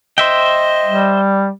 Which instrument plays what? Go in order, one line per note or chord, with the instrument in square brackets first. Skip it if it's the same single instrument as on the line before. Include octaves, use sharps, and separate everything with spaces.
[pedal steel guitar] C5 E5 G5 [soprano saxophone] D#5
[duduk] G3